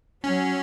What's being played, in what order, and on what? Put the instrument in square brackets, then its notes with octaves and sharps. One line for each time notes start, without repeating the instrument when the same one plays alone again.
[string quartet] F#3 [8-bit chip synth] C#4